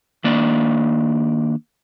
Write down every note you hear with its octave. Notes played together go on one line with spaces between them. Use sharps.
D#3 A#3 D4 D5